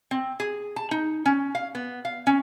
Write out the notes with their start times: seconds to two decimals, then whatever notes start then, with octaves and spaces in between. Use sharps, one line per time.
0.11 C4
0.40 G#4
0.76 A5
0.91 D#4
1.26 C#4
1.55 F5
1.75 B3
2.05 F5
2.27 C#4